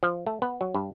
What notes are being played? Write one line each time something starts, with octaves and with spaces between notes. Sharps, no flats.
F3
A3
B3
F#3
G2